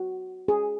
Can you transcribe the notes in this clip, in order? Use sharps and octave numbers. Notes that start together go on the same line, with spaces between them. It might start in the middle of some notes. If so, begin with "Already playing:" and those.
Already playing: F#4
G#4